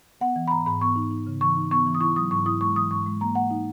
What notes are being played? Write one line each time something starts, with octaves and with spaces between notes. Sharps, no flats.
B3 F#5
E3
B5
G#2 A#5
G#2 B5
B3 C#6
D#4
D#4
C#3
E3 C#6
D#4
B3 C#6
E3
D#6
E4 C#6
F#3 D#6
G#2 C#6
E4 D#6
G#3 C#6
E3 D#6
G#2 C#6
G#3
A#3 A#5
A#3 F#5
D#4